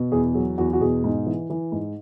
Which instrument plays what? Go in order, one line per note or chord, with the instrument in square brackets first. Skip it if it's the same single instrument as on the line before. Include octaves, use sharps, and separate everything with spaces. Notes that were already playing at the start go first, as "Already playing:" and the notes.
Already playing: [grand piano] B2
E2 G#4
F#3 G#4
E2 F#4
F#4
B2 G#4
G#2
E3
E3
G#2